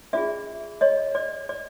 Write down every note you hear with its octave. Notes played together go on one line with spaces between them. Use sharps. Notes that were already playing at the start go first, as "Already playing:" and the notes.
C#4 F4 G#4 D5 E5
C#5 D#5
D5
D5